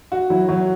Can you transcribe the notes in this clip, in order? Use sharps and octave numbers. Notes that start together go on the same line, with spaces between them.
F#4
F#3 E4
F#3 F#4